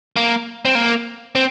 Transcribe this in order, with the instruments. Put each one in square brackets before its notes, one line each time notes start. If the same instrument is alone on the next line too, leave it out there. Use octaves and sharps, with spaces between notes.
[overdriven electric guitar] A#3
C4
A#3
C4